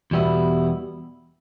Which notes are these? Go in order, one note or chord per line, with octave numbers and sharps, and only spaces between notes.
E2 B2 G3 B3 E4